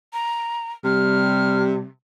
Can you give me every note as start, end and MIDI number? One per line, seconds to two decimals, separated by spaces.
0.13 0.72 82
0.85 1.88 48
0.85 1.85 55
0.85 1.62 89